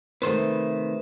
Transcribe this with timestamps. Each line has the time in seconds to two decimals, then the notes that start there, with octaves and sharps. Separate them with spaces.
0.22 C3 D#3 A3 B4 C5